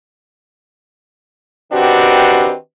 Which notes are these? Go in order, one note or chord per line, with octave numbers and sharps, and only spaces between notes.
D#3 C4 D4 F#4 G4 B4